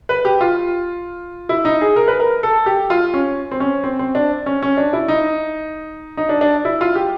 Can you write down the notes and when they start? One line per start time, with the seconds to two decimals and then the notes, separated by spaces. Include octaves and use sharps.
0.09 B4
0.25 G4
0.41 F4
1.49 E4
1.65 D#4
1.81 G#4
1.96 A#4
2.08 B4
2.20 A#4
2.43 A4
2.66 G4
2.90 F4
3.14 C#4
3.52 C4
3.60 C#4
3.84 C4
3.99 C4
4.15 D4
4.46 C#4
4.62 C#4
4.77 D4
4.93 E4
5.08 D#4
6.17 D#4
6.29 D4
6.41 D4
6.65 E4
6.81 F4
6.95 G4